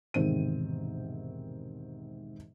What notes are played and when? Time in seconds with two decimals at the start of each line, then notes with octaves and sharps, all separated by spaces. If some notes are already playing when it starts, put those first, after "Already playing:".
0.14 E1 G#2 C3 D#3 C4 D#7